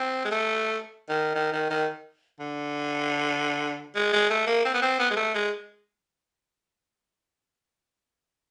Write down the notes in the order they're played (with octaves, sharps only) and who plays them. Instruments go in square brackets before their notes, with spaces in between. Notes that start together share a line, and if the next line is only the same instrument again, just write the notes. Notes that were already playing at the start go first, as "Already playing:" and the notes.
Already playing: [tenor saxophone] C4
G#3
A3
D#3
D#3
D#3
D#3
D3
G#3
G#3
A3
A#3
C4
B3
C4
B3
G#3
A3
G#3